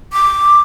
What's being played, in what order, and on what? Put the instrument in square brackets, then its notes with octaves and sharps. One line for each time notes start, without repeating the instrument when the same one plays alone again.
[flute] D6